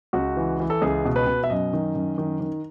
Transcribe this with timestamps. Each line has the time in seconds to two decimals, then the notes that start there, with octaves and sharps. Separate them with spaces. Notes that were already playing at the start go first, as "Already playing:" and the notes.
0.13 C#2 F#4
0.37 E3
0.60 E3
0.70 A4
0.82 C#2 G#4
1.05 B2
1.16 B4
1.27 B2
1.44 E5
1.50 F#2 D#5
1.73 D#3
1.95 F#2
2.18 D#3
2.41 D#3